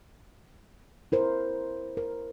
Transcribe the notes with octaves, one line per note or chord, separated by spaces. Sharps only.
E4 A#4 C5
A#4